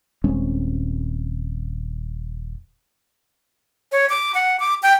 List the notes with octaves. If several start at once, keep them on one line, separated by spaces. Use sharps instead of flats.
D#1 G#3 C4 C#4
C#5
D6
F#5
D6
G5